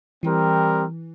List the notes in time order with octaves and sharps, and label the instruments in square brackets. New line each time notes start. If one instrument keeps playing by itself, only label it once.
[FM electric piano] E3 [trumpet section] G3 C4 G4 A#4